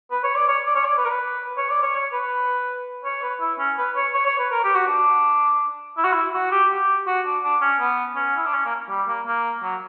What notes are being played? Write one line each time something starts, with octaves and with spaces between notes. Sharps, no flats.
B4
C#5
D5
C#5
D5
C#5
D5
B4
A#4
B4
C#5
D5
C#5
C#5
B4
C#5
B4
E4
C#4
B4
C#5
C#5
C#5
B4
A#4
G4
F#4
D4
E4
F#4
E4
F#4
G4
G4
F#4
D4
D4
C#4
B3
C#4
E4
D4
C#4
A#3
G3
A#3
A#3
F#3